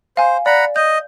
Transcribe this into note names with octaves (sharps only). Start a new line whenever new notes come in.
C5 F5 G#5
D5 F#5 A#5 B5
D#5 G6